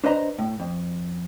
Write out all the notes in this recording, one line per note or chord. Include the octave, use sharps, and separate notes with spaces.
D4 B4 C5 D#5 A#5
A2
F2